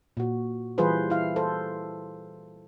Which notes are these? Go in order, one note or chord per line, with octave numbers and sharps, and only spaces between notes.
A#2 F#4
E3 G3 F4 G#4 B4 C5
E4 F5
A4 C5